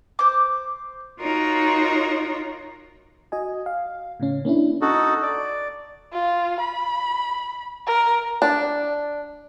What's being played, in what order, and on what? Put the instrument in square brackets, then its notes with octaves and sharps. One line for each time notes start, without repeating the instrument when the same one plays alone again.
[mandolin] C5 D6
[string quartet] D#4 F4 F#4 A#4 C#5
[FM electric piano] F#4 D#5 G#5
F5
A2 C#3 C#4
A#3 C#4 D4 E4
[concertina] D#4 F#4 A4
D5
[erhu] F4
B5
A#4
[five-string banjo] D4